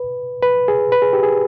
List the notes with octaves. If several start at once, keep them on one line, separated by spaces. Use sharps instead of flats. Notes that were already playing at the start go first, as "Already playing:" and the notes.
Already playing: B4
B4
G#4
B4
G#4
G4
G#4